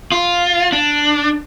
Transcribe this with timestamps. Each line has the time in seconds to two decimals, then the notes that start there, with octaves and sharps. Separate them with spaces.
0.12 F4
0.72 D4